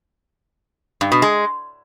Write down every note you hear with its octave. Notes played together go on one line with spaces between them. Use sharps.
G2
B2
G#3